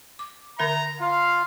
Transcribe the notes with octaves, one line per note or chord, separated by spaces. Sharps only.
D6
D3 A#4 E5 A#5
F4 F5